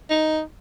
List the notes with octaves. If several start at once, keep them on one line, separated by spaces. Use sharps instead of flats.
D#4